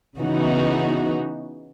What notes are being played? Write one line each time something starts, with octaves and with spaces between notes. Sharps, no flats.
C#3 E3 B3 D#4 F#4